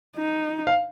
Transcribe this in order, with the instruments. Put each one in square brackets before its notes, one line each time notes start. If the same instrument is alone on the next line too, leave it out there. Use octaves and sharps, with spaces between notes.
[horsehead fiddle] D#4
[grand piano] F5